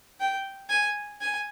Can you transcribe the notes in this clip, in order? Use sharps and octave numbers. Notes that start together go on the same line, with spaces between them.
G5
G#5
G#5